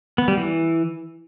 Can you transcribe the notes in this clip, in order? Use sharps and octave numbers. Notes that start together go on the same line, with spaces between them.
B3
G3
E3